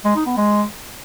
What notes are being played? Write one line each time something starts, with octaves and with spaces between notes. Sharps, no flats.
G#3
D#4
B3
G#3